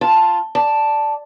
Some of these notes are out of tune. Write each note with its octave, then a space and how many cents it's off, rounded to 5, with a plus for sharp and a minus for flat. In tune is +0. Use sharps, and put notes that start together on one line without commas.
F4 +0 A5 +0
D5 +0 A5 +0